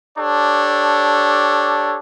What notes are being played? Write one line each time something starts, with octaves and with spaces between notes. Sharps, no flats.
D4 G4 A4 C#5